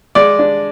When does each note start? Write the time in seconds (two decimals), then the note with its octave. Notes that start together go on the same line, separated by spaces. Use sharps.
0.15 G#3 D5
0.39 D4